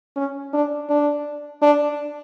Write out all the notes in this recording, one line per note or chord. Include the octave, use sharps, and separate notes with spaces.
C#4
D4
D4
D4